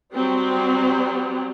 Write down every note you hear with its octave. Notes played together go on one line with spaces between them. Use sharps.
F#3 G3 C4